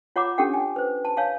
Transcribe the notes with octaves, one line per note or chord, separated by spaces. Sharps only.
F4 C#5 F#5 A#5 D6
C#4 D4 G4 A4 F#5 G5
G#5
B4 C5
A5
C#5 F5 G#5 A5